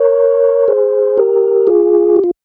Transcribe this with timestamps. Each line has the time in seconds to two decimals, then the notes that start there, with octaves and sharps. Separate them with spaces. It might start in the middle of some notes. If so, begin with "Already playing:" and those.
Already playing: A#4 C#5
0.68 G#4 C5
1.17 G4 A#4
1.67 F4 G#4
2.16 G4
2.24 F4